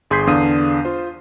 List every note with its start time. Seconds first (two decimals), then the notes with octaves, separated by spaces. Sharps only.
0.10 G1 G#4 C6 G6 B6 C7
0.27 E2 D3 D4 F5 D#6 D#7
0.85 F4 C5